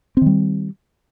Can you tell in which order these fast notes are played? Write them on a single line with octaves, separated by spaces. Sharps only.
C4 D#3 G3